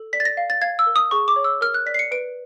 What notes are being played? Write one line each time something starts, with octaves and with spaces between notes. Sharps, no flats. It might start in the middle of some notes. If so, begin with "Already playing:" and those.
Already playing: A4
D5 B6
A6
A#6
F5
A6
F5 G#6
E6
A#4
D#6
G#4 C#6
D6
C#5
E6
A#4 F6
F#6
D5 B6
C7
C#7
B4 D7